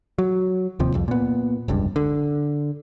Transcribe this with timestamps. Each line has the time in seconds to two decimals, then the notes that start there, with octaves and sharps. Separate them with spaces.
0.18 F#3
0.79 D1 D#2 C3 F3
0.94 C2 F2
1.08 A#2 B3
1.68 F1 C#2 G2
1.96 D3